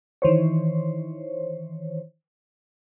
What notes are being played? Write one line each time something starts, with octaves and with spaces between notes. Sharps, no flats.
D#3 E3 C5 C#5